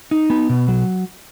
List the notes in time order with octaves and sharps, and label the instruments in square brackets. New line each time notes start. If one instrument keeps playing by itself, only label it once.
[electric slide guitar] D#4
B3
B2
F#3